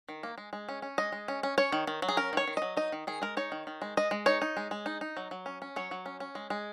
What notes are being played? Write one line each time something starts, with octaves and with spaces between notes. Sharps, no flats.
D#3
A#3
G#3
G#3
C#4
C#4
G#3 D#5
G#3
C#4
C#4
C#4 C#5
D#3
D#3
F#3
G#4
C#4 A#4
D#3 C#5
D#3
F#3 D#5
D#4 D#5
D#3
D#3 G#4
G#3 A#4
D#4 C#5
D#3
D#3
G#3
G#3 D#5
G#3
D#4 C#5
D#4
G#3
G#3
D#4
D#4
F#3
F#3
C#4
C#4
F#3 C#5
F#3
C#4
C#4
G#3
G#3